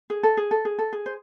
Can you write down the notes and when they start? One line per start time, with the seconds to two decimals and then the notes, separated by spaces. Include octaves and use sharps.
0.10 G#4
0.23 A4
0.37 G#4
0.51 A4
0.65 G#4
0.79 A4
0.93 G#4
1.06 C5